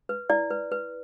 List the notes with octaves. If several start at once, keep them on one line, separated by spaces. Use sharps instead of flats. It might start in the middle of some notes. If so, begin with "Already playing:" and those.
B4
E4 D5
B4
B4